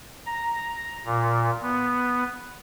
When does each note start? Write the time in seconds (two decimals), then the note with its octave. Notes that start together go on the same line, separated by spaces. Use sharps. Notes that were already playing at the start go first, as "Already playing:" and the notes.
0.26 A#5
1.05 A#2
1.62 B3